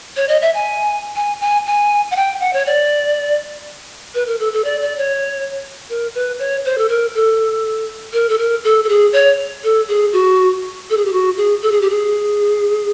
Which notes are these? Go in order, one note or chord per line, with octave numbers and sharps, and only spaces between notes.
C#5
D#5
E5
G#5
G#5
G#5
G#5
F#5
G5
F#5
C#5
D5
B4
A#4
A4
A4
D5
D5
C#5
A#4
B4
C#5
C5
A4
A#4
A4
A#4
A4
A#4
A4
A4
G#4
C#5
A4
G#4
F#4
A4
G#4
G4
F#4
G#4
A4
G#4
G4
G#4